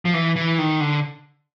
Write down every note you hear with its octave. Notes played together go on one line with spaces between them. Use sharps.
F3
E3
E3
D#3
D3